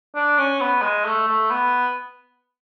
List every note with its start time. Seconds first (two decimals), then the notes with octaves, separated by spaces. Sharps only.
0.15 D4
0.38 C#4
0.60 B3
0.82 G#3
1.05 A3
1.27 A3
1.51 B3